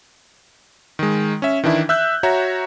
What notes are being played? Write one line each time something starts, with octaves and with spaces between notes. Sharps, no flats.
D#3 G#3
C#4 E5
D#3 E3 D4 E4
E5 E6 F#6 G6
F#4 C#5 E5 A#5